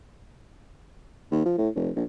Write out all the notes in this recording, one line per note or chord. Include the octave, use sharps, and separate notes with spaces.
D#2
F3
A2
F1
A#1